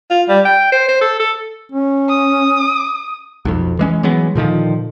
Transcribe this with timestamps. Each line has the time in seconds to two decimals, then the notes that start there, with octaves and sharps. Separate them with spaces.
0.10 F4
0.29 G3
0.45 G5
0.72 C5
0.88 C5
1.01 A4
1.20 A4
1.72 C#4
2.09 D#6
3.45 B1 F2
3.79 E3 G#3 C#4
4.03 E3 F#3 G#3 B3
4.35 A#2 D3 D#3 F3